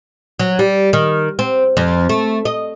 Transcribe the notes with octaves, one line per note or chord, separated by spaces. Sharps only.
F#3
G3
D#3
C4
F2
A3
D#5